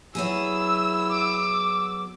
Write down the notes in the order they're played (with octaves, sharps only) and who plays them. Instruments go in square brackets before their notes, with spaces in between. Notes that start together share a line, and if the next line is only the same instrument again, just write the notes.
[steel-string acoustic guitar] F#3 B3 G#4 [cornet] E4 [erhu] E6
[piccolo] D6